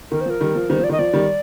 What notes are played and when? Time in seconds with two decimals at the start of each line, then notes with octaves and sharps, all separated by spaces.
0.11 D#3 A#4
0.21 C5
0.26 F3 A#4
0.40 D#3 G3
0.55 F3
0.70 D#3 G3 C5
0.79 F3
0.84 D5
0.89 D#3 D#5
0.99 F3 D5
1.13 D#3 G3